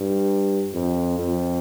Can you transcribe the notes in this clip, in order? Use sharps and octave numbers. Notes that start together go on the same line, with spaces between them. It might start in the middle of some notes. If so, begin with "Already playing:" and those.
Already playing: G2
F2
F2